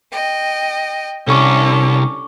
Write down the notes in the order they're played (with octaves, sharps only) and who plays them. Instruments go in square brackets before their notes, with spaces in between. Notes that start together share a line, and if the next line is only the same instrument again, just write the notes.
[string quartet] D#5 G5
[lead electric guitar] C2 [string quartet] C#4 D4 C#5 [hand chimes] A4 C#6 D6